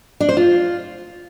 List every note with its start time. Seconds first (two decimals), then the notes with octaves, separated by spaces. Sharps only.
0.20 D4
0.29 C5
0.37 F4